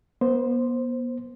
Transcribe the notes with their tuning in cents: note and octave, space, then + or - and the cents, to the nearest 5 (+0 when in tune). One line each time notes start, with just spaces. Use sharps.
B3 -35 C5 +0